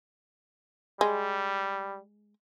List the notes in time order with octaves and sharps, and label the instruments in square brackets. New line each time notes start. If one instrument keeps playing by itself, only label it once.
[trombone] G3 [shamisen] G#3